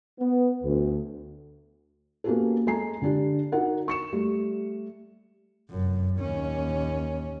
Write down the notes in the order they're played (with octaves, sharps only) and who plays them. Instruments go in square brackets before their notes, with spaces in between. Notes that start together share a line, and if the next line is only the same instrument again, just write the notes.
[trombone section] B3
D2
[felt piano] A#3 B3 C#4 F#4 G4 A4
G#3 A4 G#5 A#5 C7
D3 D4 G4
D#4 F#4 A#4 F#5
C#6 C#7 E7
G3 A3
[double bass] F1 F#2
D#2 C#4